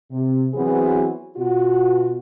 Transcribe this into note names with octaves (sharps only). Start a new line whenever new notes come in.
C3
E3 F#3 B3 C4 F#4 G#4
B2 F4 F#4